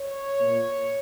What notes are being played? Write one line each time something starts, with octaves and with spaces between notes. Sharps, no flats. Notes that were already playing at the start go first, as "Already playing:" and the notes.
Already playing: C#5
A#2